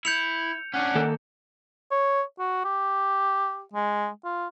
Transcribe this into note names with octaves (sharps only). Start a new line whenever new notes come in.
E4 G6 C#7 F7
C#4 D4 F#5
D#3 A#3 A4
C#5
F#4
G4
G#3
F4